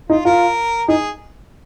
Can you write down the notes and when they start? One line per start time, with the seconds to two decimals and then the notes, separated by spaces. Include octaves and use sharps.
0.09 D#4 F4
0.25 F4 A#4
0.88 D#4 G#4